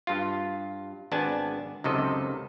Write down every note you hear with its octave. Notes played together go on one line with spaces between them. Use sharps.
G2 F4
G#1 B3 D4 G#5 A5
C#2 F#2 C3 D#3 A4 D#5